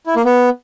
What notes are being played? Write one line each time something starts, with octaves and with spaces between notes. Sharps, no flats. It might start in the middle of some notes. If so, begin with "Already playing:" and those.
E4
A#3
B3